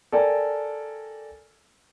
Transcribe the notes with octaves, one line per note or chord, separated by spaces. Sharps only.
A4 A#4 D5 G5 G#5